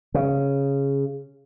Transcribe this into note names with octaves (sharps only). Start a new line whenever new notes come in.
C#3